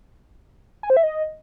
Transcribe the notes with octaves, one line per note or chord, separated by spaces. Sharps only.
G#5
C5
E5
D#5